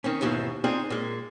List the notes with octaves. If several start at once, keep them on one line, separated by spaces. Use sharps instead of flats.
D#3 C4 C#4
D#2 G#2 B2 E3 F3
C4 D4 D#4 F4 G#4
A#2 G#3